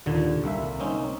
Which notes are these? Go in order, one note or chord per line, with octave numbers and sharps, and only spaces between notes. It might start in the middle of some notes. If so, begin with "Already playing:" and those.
D#2 A#2 D3
C2 A#3 E5
A#3 C4 C#4 D#4